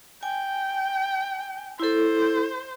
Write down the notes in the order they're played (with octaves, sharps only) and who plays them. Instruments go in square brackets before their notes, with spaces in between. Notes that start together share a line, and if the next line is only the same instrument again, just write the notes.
[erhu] G5 [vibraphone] G#5
[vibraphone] E4 A4 [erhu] C5